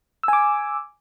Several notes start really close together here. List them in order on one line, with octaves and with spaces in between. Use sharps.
E6 G#5 D6